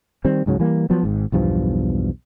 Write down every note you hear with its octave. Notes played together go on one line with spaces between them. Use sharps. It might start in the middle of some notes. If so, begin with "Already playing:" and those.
D#3 G3 C4
C#2 G#2 C#3 F#3
E3 G3 A#3
F3 F#3 B3
G#1 G#2
B1 E2 G2 F3